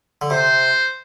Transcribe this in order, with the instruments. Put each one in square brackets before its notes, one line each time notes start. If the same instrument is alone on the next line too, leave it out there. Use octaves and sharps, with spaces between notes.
[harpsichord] D3
[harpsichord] C3 [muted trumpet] C5